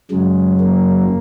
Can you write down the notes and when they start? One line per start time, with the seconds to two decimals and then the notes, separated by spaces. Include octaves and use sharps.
0.11 F#2 C#3 F#3 G#3
0.61 A#3